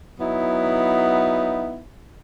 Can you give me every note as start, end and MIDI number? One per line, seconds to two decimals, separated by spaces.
0.20 1.80 54
0.20 1.80 59
0.20 1.80 63
0.20 1.80 64